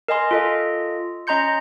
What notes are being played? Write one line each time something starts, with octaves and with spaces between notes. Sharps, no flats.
A#4 D#5 G#5 C6
F4 A4 D#5
C#4 D#5 A#5 C6 G6 C#7